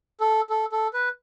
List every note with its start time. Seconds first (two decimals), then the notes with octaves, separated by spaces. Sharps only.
0.20 A4
0.50 A4
0.72 A4
0.93 B4